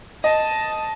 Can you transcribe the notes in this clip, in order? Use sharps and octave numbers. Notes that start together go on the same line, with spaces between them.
D#5 A5